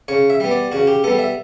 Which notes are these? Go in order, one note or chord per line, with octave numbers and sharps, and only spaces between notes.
C#3 C#5
E5
G3 B3
D5
C#3 F#4
G4
G3 B3 A4
E5